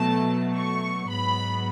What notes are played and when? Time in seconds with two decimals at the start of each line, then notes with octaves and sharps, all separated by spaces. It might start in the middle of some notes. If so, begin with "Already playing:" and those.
Already playing: B2 F#3 A3 A5
0.55 C#6
1.09 G#2 F#3 B3 B5